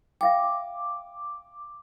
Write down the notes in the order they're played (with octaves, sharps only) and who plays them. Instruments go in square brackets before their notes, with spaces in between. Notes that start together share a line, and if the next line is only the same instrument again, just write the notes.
[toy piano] E5 F5 G5 [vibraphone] D6